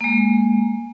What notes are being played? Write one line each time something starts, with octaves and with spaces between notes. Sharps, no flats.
G#3 A#3